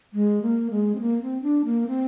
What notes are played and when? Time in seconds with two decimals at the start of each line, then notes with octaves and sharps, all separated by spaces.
0.13 G#3
0.42 A#3
0.71 G#3
0.95 C4
1.00 A#3
1.22 C4
1.43 D4
1.65 A#3
1.87 C4